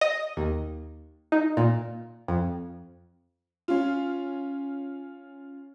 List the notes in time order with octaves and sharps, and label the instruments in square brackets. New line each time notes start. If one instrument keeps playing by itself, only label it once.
[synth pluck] D#5
D#2
D#4
A#2
F2
[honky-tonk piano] C#4 F4